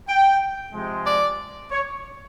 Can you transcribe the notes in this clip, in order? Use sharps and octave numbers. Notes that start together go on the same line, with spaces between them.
G5
C3 F3 G#3
D5
C#5